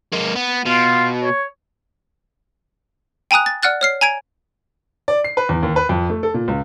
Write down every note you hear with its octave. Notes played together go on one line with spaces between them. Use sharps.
G#3 A#3
B3
B2 F4
C#5
G5 G#5 A#5 D#6 F#6
A6
D5 F#5 F6 F#6 A6
C#5 F6 C7
G#5 A#5 G#6 D7
D5
C7
B4
E2
D#2
B4
F2
A3
A4
A#2
C#2